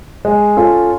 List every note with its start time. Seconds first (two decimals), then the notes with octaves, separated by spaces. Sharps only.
0.25 G#3
0.57 C#4 F4 A4